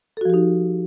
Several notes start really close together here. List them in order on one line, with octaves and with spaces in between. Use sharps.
A4 F#4 F3 G4 D#4